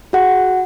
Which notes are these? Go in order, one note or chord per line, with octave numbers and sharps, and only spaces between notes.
F#4 G#4 F#5